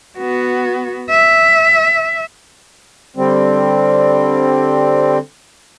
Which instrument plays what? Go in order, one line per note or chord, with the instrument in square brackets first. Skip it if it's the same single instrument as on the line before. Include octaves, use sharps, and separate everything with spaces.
[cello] B3 F#4
E5
[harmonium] D3 G3 C4